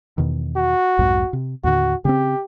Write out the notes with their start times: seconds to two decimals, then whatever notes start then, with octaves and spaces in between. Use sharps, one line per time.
0.18 E2 B2 D#3
0.56 F#4
0.99 B1 F2 G#2
1.33 C3
1.64 D#2 A2 D3 F#4
2.05 C#3 B3 C4 G4